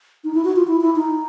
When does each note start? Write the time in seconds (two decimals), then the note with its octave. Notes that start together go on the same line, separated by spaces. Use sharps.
0.24 D#4
0.34 E4
0.45 F#4
0.56 F4
0.67 E4
0.81 E4
0.96 D#4